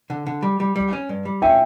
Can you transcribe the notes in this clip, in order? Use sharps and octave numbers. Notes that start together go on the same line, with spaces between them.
D3
D3
G3
G3
G3
C#4
G2
G3
C#4 E5 G5